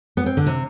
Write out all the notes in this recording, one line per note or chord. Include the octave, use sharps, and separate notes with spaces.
B3
C4
D3
C3